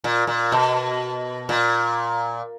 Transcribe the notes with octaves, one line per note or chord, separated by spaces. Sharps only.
A#2
A#2
B2
A#2